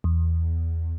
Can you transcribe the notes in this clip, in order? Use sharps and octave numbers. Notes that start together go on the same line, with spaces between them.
E2